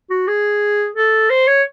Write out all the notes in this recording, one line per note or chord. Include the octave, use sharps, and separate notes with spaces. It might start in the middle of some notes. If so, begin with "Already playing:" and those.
F#4
G#4
A4
C5
C#5